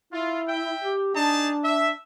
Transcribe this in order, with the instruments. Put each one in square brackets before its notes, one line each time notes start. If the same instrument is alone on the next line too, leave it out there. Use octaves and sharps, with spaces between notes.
[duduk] E4 [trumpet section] F4
[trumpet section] E5 G5
[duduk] G4
[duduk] D4 [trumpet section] D#4 G#4 A5
[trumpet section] E5